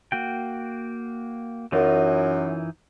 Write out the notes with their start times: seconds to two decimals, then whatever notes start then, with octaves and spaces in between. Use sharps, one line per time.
0.12 A#3 F#4 G5
1.72 F#2 E3 D#4 F4